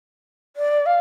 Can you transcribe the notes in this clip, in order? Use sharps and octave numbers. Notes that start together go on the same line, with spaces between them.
D5
F5